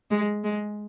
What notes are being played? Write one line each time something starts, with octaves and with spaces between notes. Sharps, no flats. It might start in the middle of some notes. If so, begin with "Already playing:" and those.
G#3
G#3